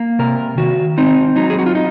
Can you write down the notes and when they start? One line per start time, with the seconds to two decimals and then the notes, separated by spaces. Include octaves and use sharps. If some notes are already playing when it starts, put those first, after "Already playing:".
Already playing: A#3
0.19 C3 A#4
0.57 D#3 F#4
0.98 C4 D#4
1.36 F#3 D#4
1.50 G#4
1.59 F#4
1.66 F4
1.75 D#4